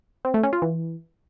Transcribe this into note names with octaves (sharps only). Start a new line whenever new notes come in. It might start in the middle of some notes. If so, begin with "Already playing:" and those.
C4
A3
C#4
F4
E3